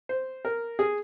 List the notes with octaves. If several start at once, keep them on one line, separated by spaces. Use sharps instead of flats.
C5
A#4
G#4